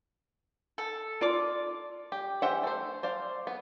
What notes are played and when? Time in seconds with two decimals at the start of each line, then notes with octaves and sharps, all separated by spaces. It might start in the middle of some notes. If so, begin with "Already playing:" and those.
0.78 A4
1.21 F4 D5 D6
2.12 G4
2.42 E3 G4 C5 E5 F#5
2.63 A3 C5
3.03 C5 D5 F5
3.47 B3